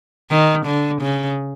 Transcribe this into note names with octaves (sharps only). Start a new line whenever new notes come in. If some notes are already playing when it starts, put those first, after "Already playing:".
D#3
D3
C#3